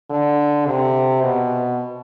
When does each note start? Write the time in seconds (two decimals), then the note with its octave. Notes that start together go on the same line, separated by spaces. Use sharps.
0.10 D3
0.66 C3
1.22 B2